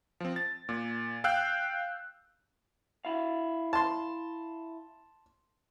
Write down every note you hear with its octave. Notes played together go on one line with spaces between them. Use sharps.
F3 C4
A6
A#2
F5 G5 E6 F#6 G6
E4 F5
A5 C6